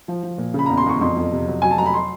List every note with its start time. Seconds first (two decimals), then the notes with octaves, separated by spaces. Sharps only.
0.08 F3
0.23 F3
0.38 A#2
0.54 C#3 B5
0.66 E2 A#5
0.78 C6
0.86 E2 C#6
1.01 F2 C6
1.17 F2
1.32 C3
1.47 F#3
1.62 F#3 G#5
1.71 A5
1.78 F#3 A#5
1.86 B5
1.94 C6